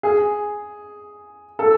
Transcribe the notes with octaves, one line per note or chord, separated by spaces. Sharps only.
G#4
A4